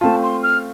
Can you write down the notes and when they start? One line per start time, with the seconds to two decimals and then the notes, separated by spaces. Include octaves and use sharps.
0.01 A3 C4 F4 A5
0.23 C6
0.43 F6